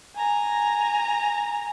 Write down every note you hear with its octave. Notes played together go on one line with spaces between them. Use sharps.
G#5 A#5